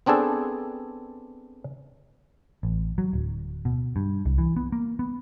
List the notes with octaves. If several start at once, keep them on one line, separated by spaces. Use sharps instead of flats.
B3 C4 D4 G#4 A4
A1
F#3
D1
B2
G2
C2
E3
B3
A#3
B3